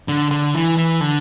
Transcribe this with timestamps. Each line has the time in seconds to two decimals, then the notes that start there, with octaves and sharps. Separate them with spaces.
0.08 D3
0.31 D3
0.55 E3
0.78 E3
1.00 D3